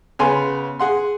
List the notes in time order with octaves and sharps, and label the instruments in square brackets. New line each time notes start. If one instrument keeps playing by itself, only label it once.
[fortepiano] C#3 B3 G#5 C6
G#4 F#5 C6